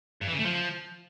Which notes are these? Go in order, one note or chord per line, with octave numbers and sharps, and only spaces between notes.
G2
E3
C#3
A3
F3